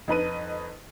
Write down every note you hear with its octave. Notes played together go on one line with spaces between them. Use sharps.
F2 D#4 B4 D#7